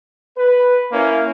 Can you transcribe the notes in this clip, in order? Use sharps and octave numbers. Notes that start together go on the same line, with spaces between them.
B4
A#3 C#4 E4